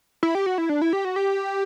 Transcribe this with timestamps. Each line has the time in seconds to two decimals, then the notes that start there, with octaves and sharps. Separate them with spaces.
0.23 E4
0.35 G4
0.46 F#4
0.58 E4
0.69 D4
0.82 E4
0.93 G4
1.05 F#4
1.16 G4